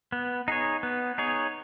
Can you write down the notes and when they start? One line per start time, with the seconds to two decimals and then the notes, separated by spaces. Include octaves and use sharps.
0.12 B3
0.48 D#4 G#4 C#5
0.83 B3
1.18 D#4 G#4 C#5